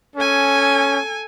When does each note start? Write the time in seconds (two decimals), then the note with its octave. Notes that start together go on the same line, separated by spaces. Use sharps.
0.16 C#4 A4 G#5